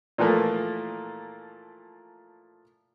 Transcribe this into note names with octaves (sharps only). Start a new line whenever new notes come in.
A#2 E3 F3 A3 A#3